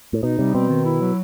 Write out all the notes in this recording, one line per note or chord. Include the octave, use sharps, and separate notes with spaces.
A2
B2 D#4
C3 G3
B2 C4
D#3
E4
F#3